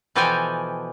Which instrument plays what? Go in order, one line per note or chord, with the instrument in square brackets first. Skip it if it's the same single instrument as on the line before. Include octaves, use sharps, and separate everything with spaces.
[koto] B2 E3 F3 A4 G5 G#5